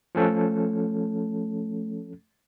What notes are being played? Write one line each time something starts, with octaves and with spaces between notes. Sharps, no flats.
F3 A3 C#4 A4